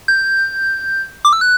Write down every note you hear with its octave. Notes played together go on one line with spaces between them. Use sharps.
G6
D6
E6
F#6